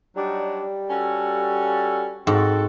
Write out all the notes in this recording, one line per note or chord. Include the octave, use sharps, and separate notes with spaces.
F#3 G3 D4 D#4
C#4 F#4 A4
G#2 C4 F#4 A4